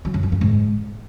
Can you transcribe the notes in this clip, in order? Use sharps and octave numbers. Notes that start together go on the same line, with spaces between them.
F#3
F#2
F#3
G2
G#2